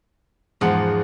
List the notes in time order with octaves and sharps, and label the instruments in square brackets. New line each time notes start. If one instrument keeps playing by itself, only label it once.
[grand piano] E2 F3 F#5 [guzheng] G#2